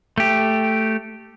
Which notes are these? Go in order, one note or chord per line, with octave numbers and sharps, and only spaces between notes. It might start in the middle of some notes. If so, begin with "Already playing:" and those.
A3 G4